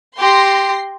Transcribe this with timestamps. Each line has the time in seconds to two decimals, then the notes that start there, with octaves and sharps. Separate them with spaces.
0.19 G4 C6 A#6 C7